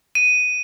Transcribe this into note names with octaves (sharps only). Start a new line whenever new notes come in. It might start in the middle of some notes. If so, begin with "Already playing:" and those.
D#7